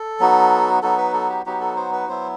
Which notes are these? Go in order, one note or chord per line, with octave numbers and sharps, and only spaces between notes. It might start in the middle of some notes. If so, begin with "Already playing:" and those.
Already playing: A4
F#3 B3 D#4 F#4
F#3 B3 D#4 F#4 A4
B4
A4
G4
F#3 B3 D#4 F#4 G4
A4
C5
B4
F#3 B3 E4 C5